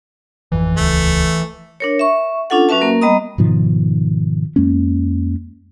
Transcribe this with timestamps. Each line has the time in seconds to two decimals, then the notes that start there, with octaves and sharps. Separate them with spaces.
0.52 G#1 F2 E3
0.77 D#1 C#2 A3
1.80 D4 A#4 C#5
1.99 E5 C#6
2.50 C#4 D4 F4 A4 F#5
2.69 F#3 C#4 F#4 B4 E5 A5
2.81 A#3 A#4
3.02 G3 B3 D#5 A#5 D#6
3.38 G#2 B2 D#3 F3
4.56 F2 G#3 A#3 C#4